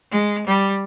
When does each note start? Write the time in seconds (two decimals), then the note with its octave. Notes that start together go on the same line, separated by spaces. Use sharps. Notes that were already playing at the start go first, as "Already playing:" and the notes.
0.11 G#3
0.47 G3